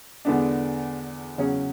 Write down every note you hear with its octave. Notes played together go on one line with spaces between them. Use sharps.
E2 D3 G#3 B3 D4
E2 C#3 F#3 C#4 G#4